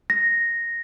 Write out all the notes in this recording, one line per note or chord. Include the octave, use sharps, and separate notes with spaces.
A#6